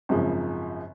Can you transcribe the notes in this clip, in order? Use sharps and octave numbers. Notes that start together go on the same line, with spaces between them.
G#1 F#2 C#3 F3